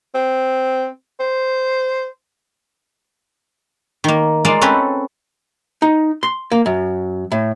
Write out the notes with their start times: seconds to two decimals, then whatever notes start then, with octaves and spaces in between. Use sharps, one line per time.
0.15 C4
1.20 C5
4.04 D#3 A#3
4.45 G#3 A#3 F4 D5 F5
4.61 C4 C#4 A4 B4 C#5
5.82 D#4
6.23 C6
6.52 A#3
6.66 F#2
7.32 A2